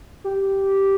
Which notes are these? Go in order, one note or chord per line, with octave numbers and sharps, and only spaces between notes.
G4